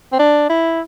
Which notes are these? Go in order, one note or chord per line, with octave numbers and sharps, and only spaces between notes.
C4
D4
E4